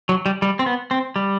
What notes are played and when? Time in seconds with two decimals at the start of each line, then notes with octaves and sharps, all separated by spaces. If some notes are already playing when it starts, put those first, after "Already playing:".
0.09 F#3
0.26 G3
0.42 G3
0.59 C4
0.66 B3
0.91 C4
1.16 G3